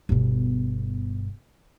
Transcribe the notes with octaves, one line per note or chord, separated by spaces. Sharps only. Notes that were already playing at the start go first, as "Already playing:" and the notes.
G1 B2